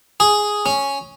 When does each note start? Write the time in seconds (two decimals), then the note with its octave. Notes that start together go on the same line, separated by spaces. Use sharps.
0.20 G#4
0.66 C#4